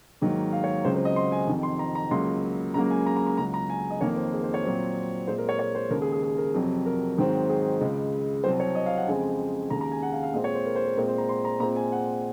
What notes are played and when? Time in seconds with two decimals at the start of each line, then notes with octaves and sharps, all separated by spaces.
0.21 G#2 D#3 F#3 A#3
0.53 F5
0.64 C#5
0.85 C#2 C#3 F#3 C4 C5
0.95 C5
1.05 D#5
1.16 C6
1.32 G#5
1.47 F2 C3 D#3
1.63 C6
1.79 A#5
1.95 A#5
2.11 C#2 C#3 F#3 A#3 C6
2.74 C#2 C#3 F#3 A#3 A#5
2.90 G#5
3.06 A#5
3.16 A#5
3.27 A#5
3.38 C#2 C#3 F#3 A#5
3.54 A#5
3.70 G#5
3.90 D#5
4.01 F2 D#3 A#3 C#5
4.16 C5
4.33 G#4
4.43 C5
4.54 C#5
4.64 A#2 F#3 C4
5.28 A#2 G#3 C4 C5
5.38 A#4
5.49 C#5
5.59 C#5
5.75 C5
5.91 D#2 C#3 G#3 A#4
6.02 G#4
6.12 G#4
6.23 G#4
6.38 A#4
6.54 F2 C3 F#3
6.86 A#4
7.18 G#2 D#3 F#3 C4
7.49 G#4
7.81 C#2 C#3 G#3
8.44 C2 C3 F#3 C4 C5
8.60 C#5
8.75 D#5
8.86 F5
8.97 F#5
9.08 F2 C#3 G#3 C4 G#5
9.70 D#2 C#3 G#3 A#5
9.81 A#5
9.92 G#5
10.03 F#5
10.12 F5
10.23 F5
10.34 A#2 G#3 C4 D#5
10.44 C#5
10.55 C5
10.66 A#4
10.75 C5
10.86 A#4
10.97 A#2 G#3 C4 A#4
11.08 C5
11.18 A#5
11.29 C6
11.45 A#5
11.60 A#2 G#3 C4 A#5
11.76 G#5
11.92 F#5